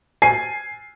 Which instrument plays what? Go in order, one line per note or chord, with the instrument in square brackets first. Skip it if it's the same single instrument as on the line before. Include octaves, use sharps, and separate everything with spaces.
[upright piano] G#5 C7